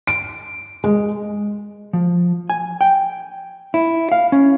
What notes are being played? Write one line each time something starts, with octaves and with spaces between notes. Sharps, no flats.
D7
G#3
F3
G#5
G5
E4
F5
C#4